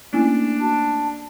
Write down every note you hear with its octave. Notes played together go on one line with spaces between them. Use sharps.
A3 A#3 C#4 D4 E4 G#5
F#4 A5